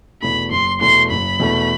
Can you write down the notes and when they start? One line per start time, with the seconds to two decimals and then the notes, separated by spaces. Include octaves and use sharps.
0.22 E2 B2 A3 B5
0.51 F#1 C6
0.81 E2 B2 A3 C6
1.11 F#1 B5
1.40 E2 B2 A3